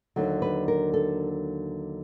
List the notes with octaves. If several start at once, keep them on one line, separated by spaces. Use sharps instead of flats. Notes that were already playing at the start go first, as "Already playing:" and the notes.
D#2 D3 F#3
B4
A#4
A4